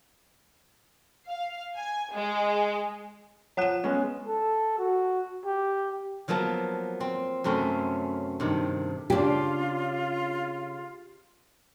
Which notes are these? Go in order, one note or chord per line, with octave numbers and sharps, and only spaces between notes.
F5
G#5
G#3
F3 C#5 F#5 F#6 E7
G#3 B3 C#4
A4
F#4
G4
F3 F#3 A#3 B3 A5
C4
F#2 C3 A3 C4 C#4
G2 C3 D#3
C#3 D4 F4 G4